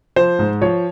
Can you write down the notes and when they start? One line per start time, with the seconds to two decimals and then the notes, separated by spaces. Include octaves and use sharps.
0.16 F3 C5
0.39 G#2
0.61 F3 C#5